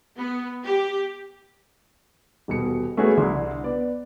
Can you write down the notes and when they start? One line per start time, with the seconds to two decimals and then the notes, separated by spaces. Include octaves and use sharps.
0.17 B3
0.64 G4
2.48 D#1 B2 C#7
2.97 A3 B3 C#4 E4 F#4 G#4
3.17 C2 D3 E4 C6
3.64 B3 D5